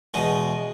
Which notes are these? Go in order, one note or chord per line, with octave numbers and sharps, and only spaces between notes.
E2 B2 G#3 D#4